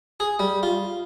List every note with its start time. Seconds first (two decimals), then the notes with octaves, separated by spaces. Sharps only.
0.20 G#4
0.39 G3
0.63 F4